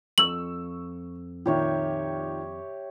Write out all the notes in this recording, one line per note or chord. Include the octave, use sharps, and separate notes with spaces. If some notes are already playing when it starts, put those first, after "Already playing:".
F2 C#6 E6 F#7
A#2 D#3 G4 C#5 E5